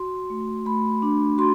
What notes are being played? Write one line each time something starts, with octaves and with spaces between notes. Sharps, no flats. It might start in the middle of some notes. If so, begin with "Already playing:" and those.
Already playing: F#4 C6
A3
A3 B5
D4
F#4 C6